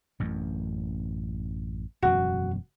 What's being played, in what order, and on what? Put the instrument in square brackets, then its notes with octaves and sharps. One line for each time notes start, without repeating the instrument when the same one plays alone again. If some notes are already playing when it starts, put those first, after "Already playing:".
[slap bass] A1 F#2
[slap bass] E1 F#2 C#3 [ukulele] F#4